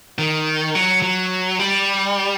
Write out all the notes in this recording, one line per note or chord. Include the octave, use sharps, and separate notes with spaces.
D#3
F#3
F#3
G3